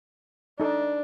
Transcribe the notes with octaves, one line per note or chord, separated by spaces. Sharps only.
D4 D#4 A4 A5